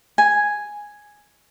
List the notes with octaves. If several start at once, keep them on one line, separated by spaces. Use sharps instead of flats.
G#5